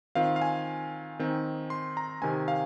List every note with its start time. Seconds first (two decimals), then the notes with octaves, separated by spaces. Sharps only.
0.15 D#3 C4 F4 F5
0.36 F5
0.42 G#5
1.19 D#3 C4 D#4
1.70 C6
1.97 A#5
2.22 C3 D#3 C4 G#5
2.48 F5